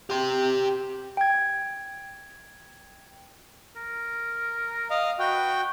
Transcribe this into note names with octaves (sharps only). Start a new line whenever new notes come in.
G4 C6
G5 G#6
A#4
D#5 F5
F#4 B4 G5